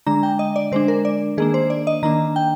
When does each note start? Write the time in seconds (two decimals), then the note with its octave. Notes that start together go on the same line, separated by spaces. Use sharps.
0.06 D3 G#3 D4 A#5
0.23 G5
0.39 D#5
0.56 D5
0.72 D3 G#3 D4 C5
0.88 A#4
1.05 D5
1.38 D#3 A#3 D4 G#4
1.54 C5
1.70 D5
1.87 D#5
2.03 D#3 A#3 D4 A#5
2.36 G5